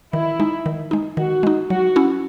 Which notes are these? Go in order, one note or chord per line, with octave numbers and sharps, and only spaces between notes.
D#3 E4
G#3 D#4
D#3
G#3 D#4
D#3 F#4
G#3 D#4
F#3 F#4
C#4 E4